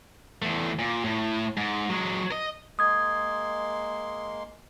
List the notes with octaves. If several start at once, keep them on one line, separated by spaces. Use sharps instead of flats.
E2 A3
A#2
A2
G#2
F#3 G#3
D#5
G#3 A#3 C6 D#6 G#6